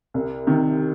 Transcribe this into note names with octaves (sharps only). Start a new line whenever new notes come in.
C2
C3 D#3